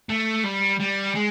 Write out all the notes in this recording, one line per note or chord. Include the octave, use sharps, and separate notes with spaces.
A3
G3
G3
G#3